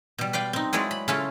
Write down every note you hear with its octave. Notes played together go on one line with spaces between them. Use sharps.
B2 G3
B4 D5 F5 G5
C4 D#4
F#3 G#3 E4 B4 C#5 D5
B5
C#3 C#4 E4 F4 A4